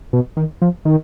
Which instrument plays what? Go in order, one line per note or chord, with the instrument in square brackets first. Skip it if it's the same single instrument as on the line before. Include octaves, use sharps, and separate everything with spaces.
[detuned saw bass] B2
D#3
F3
D#3